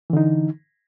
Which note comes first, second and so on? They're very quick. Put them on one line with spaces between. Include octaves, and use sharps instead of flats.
E3 D3 D#4